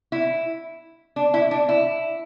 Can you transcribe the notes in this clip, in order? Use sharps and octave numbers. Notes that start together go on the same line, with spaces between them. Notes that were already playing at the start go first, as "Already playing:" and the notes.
E4
D4
E4
D4
E4